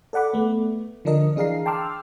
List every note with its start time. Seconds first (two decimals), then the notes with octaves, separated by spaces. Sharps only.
0.13 A4 D5 F#5 B5 D6
0.33 A3 B3
1.05 D3 F3 D4 A#4 D#5
1.36 E3 D4 G#4 F5 A#5 C7
1.66 G5 A5 C6 D6 E6 F6